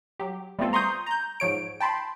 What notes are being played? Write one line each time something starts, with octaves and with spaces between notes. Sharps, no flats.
F#3 G4
G3 A3 B3 C4 F4 A4
A#5 C6 C#6 D#6 G6
A#5 G6
G#2 F3 C#5 D7
G5 A5 B5 C6